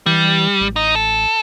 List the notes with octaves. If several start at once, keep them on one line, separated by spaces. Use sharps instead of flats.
E3 G3
A1
D#4
A4